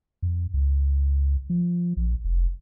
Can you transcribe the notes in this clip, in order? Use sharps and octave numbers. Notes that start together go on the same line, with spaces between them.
F2
C#2
F3
A#1
F1